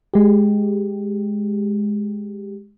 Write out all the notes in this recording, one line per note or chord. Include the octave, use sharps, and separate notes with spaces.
G#3 G4